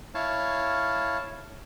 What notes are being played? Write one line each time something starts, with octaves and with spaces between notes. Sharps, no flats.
E4 C#5 F5 A5